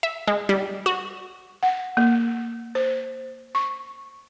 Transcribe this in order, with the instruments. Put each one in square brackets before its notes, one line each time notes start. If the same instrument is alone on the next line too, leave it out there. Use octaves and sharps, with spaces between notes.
[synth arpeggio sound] E5
G#3
G3
F#4
[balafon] F#5
A#3
C5
C#6